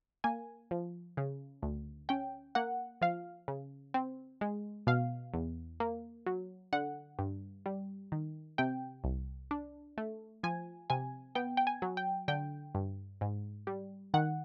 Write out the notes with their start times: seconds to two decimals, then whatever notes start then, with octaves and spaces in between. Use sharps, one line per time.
0.24 A#3 G#5
0.71 F3
1.17 C#3
1.63 D2
2.09 C#4 G5
2.55 A#3 F#5
3.01 F3 F5
3.48 C#3
3.94 C4
4.41 G#3
4.87 B2 F5
5.34 E2
5.80 A#3
6.26 F#3
6.73 D3 F#5
7.19 G2
7.66 G3
8.12 D#3
8.58 C3 G5
9.04 C2
9.51 D4
9.98 A3
10.43 F3 G#5
10.90 C3 G#5
11.35 B3 G5
11.57 G5
11.67 G#5
11.82 F#3
11.97 G5
12.28 D3 G5
12.75 G2
13.21 G#2
13.67 G3
14.14 D#3 F#5